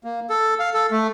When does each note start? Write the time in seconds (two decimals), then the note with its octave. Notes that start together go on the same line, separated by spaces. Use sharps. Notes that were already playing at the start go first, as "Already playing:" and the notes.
0.04 A#3
0.30 A4
0.60 F5
0.74 A4
0.91 A3